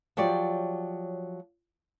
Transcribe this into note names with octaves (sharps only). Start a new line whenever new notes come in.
F3 F#3 G4 C#5 D5